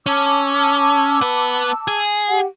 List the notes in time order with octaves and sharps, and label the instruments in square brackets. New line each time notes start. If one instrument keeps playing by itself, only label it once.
[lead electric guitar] C#4 [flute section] A5 D6 E6
[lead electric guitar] B3 B4
G#4
[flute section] G4 F#5